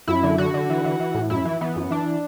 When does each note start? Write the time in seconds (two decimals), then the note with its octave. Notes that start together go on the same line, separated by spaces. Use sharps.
0.08 F#2 E4
0.23 D3
0.38 D3 F#4
0.54 D3
0.70 E3
0.84 E3
1.00 E3
1.15 A2
1.30 F#2 E4
1.45 E3
1.61 E3 B3
1.76 F#2
1.91 E3 D4